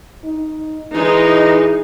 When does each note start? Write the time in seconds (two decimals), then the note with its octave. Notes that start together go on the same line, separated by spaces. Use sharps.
0.24 D#4
0.94 E3 G#3 D#4